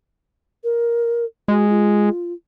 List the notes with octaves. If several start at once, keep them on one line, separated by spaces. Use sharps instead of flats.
A#4
G#3 F#4
F4